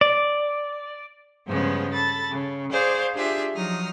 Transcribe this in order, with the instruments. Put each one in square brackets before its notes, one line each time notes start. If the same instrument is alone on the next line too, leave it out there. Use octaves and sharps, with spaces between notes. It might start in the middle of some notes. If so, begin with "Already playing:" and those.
[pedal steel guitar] D5
[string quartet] G2 C#3 F3 G#3 B3
A4 B5 A6
C#3
G#4 C5 D5 F5 C#6
D4 F4 G4 G#4 E5
F3 F#3 D#4 D#6 F6